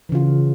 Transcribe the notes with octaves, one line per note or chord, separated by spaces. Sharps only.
C#3 E3 F4